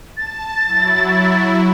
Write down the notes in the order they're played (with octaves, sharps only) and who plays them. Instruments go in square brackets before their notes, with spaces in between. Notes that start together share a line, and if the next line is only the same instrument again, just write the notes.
[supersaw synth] A5 [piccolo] A6
[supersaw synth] F#3 E4